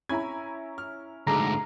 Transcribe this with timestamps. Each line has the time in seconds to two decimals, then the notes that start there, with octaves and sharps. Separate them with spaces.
0.09 C#4 E4 G#5 A#5 B5 G#6
0.78 F6
1.27 D2 G#2 G#4 A4 A#5 D6